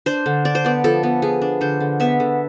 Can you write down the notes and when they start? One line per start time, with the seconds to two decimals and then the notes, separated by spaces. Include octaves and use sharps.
0.06 D4 C5
0.26 D3
0.45 D4 D5
0.55 C5
0.65 B3 D5
0.84 F3 A4
1.03 B3
1.22 B3 G#4
1.42 D4
1.61 D3 C5
1.80 D3
2.00 B3 E5
2.20 D3